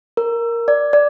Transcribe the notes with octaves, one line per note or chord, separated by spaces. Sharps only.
A#4
D5
D5